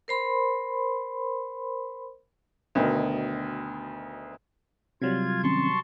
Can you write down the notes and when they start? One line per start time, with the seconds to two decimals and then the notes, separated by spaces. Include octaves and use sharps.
0.08 A#4 C5 B5 C6
2.75 D2 B2 D#3
5.02 C3 F#3 G3 F4 G#6
5.43 D#3 C4 C#4 A5 C6 C#6